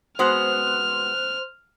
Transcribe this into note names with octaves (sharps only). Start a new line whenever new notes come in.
G#3 B3 F#4 C5 C6 F6 F#6